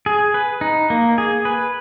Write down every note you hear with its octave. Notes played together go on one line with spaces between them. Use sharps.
G#4
B4
D#4
A#3
G#4
B4